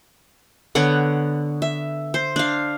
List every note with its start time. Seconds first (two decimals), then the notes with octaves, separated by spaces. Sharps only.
0.75 D3 B3 C#5 F#5
1.62 E5
2.14 C5
2.36 D4 F5